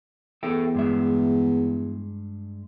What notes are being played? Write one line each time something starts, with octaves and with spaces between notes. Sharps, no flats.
E2 A4 E5 G5
G2 G#3 E5